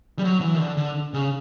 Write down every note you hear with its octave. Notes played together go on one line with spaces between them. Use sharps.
G3
F#3
E3
D#3
D3
D3
C#3